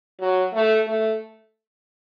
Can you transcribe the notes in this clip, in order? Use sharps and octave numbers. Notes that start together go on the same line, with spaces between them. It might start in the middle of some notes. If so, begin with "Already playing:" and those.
F#3
A3
A3